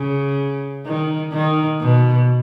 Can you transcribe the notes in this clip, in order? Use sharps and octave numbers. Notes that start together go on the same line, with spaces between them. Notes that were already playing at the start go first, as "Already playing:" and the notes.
Already playing: C#3
D#3
D#3
B2